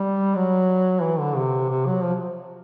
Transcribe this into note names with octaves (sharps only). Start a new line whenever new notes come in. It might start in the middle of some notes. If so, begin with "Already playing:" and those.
Already playing: G3
F#3
E3
D3
C3
C3
F#3
F3